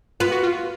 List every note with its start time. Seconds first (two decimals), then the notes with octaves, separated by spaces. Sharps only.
0.20 B3 F4
0.31 F#4
0.43 F4